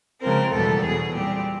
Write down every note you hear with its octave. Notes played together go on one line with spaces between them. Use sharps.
C#3 F3 G#3 C4 A#4
E2 B2 G3 B3 A4
E2 B2 F#3 G#4
A#2 G3 C4 G4